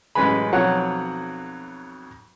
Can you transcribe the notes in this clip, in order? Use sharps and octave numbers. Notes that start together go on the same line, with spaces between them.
A1 F#2 G#3 B4 G#5 B5
B1 F2 F#3 C#5 F#5